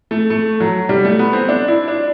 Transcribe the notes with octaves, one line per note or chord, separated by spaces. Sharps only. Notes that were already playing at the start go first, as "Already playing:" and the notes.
A3
A3
F#3
G3
A3
B3
C4
D4
E4
D4